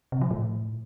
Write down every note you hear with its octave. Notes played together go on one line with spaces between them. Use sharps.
C3
F3
A2